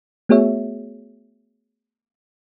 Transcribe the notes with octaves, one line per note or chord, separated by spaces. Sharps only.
A3 B3 F#4 G#4 C#5 E5